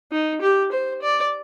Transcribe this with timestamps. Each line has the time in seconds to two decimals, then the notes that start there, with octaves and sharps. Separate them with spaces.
0.12 D#4
0.41 G4
0.72 C5
1.02 D5